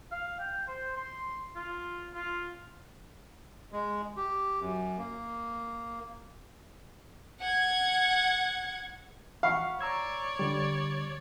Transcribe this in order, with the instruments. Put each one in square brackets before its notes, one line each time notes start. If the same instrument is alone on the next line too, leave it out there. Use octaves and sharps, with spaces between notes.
[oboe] F5
G5
C5
C6
F4
F4
[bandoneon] G#3
G4
F#2
A#3
[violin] F#5 G#6
[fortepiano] F5 [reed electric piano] F#5 B5 C#6
[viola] C#5 D5 [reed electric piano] A#5 E6 G#6
[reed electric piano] D3 G3